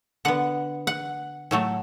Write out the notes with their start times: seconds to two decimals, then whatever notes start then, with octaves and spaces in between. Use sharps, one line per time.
0.25 D3 B3 F#5
0.87 F#5
1.51 A2 F#3 A3